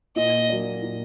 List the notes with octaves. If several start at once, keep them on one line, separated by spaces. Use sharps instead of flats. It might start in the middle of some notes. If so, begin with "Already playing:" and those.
A#2 D#5
F#3 A#3 D4
A#2